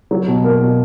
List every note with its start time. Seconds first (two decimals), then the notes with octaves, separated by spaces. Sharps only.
0.11 F#3
0.28 B2
0.44 A#3
0.61 B2